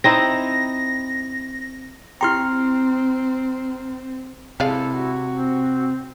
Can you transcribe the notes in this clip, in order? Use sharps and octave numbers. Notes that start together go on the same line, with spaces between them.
C4 D#4 E4 A#6
C4 E4 G4 G5 A#5 C6 F6
C3 G#3 E4 A4 D5 F5
F#4
C4